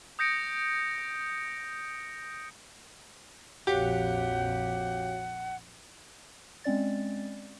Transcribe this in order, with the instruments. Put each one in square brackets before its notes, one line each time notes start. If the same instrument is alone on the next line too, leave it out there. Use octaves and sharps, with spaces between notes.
[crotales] D#6 G6 A#6 C#7 D7
[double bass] A#1 F2 [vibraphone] F#4 C#5 F5 [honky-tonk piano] G4 [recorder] F#5
[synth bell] G#3 C4 C#4 D5 A6